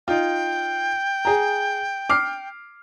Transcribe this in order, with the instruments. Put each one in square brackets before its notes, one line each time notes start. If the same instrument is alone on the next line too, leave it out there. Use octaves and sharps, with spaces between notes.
[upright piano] D#4 F4 [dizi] G5
[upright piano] G#4 A#5
D6 F6 C7